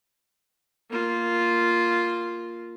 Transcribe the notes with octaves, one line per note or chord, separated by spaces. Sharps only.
A#3 F4